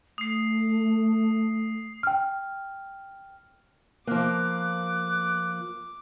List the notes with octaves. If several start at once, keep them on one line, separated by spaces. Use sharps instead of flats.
A3 D#6 C7
G5 F6
F3 A#3 D6 F#6